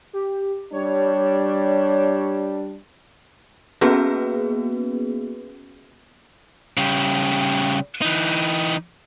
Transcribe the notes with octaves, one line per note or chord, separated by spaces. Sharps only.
G4
G3 D4 C#5
A#3 B3 C#4 F#4 G#4 B4
C#3 G3
E3 D#4